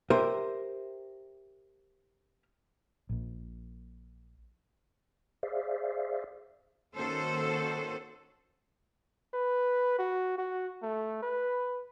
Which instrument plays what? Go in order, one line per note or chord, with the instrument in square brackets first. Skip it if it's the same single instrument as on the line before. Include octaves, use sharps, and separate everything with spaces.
[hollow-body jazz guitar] G4 A#4 C5 E5
[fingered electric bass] A#1 A#2
[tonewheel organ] G#4 C5 D5 E5 F5
[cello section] D#3 A#3 C#4 F#4 A4 C5
[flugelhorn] B4
F#4
F#4
A3
B4